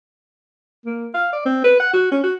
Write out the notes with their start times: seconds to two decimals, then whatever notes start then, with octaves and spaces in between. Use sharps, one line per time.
0.85 A#3
1.14 F5
1.33 D5
1.46 C4
1.64 B4
1.80 F#5
1.93 F#4
2.12 C#4
2.23 F#4